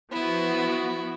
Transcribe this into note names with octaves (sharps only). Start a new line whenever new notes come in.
F3 B3 E4 F#4